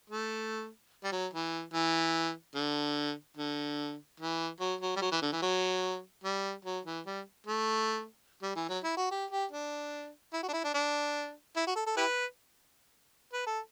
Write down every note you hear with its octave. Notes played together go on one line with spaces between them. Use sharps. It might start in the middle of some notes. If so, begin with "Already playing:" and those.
A3
G3
F#3
E3
E3
D3
D3
E3
F#3
F#3
G3
F#3
E3
D3
E3
F#3
G3
F#3
E3
G3
A3
G3
E3
F#3
E4
F#4
G4
G4
D4
E4
F#4
D4
E4
D4
D4
E4
F#4
A4
A4
E4 G4 B4
B4
A4